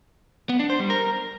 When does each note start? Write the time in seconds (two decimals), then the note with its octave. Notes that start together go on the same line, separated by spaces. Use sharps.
0.49 B3
0.60 D4
0.70 C5
0.80 G3
0.90 A#4